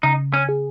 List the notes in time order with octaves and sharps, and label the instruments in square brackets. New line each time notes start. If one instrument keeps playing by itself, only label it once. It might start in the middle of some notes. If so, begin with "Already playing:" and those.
[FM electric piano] C#3 [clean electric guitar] D#4
[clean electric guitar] C#4
[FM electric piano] G#4